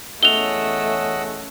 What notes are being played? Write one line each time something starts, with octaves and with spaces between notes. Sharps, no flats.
E2 A3 C#4 D#5 F#5 E6 F7 G7